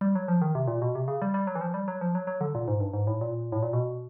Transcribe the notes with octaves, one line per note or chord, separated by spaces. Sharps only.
G3
F#3
F3
D#3
C3
A#2
B2
C3
C#3
G3
G3
F#3
E3
F3
G3
F#3
F3
F#3
F#3
D3
A#2
G#2
G2
G#2
A2
A#2
A2
A#2
B2